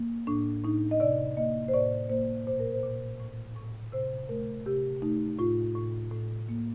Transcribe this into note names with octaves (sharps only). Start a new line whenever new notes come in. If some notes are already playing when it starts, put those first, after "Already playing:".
Already playing: A#3
A2 D4
A2 D#4
D#5
C3 D5
A#3 D#5
C5
A2 D5
A#3 C5
A#2 C5
A#4
C5
A#2
A2
A2
C3 C5
A3 A#4
C3 G4
A3 D#4
A2 F4
A2
A2
A#3